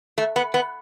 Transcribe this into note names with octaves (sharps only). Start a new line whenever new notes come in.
A3
B3
B3